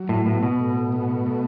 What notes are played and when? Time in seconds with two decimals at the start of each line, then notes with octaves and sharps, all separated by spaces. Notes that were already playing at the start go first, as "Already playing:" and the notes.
Already playing: F#3
0.09 A2
0.26 A2 B3
0.43 B2
0.60 A2
0.92 B3
1.26 A3